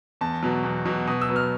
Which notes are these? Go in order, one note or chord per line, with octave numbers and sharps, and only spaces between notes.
E2 A5
B2 F#3
E2
B2 F#3
B2 D#6
E6
F#3 B3
F6